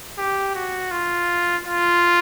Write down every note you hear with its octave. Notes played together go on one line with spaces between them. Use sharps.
G4
F#4
F4
F4